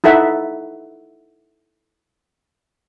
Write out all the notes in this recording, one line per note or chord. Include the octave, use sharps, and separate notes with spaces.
D#4 E4 A4 E5 F#5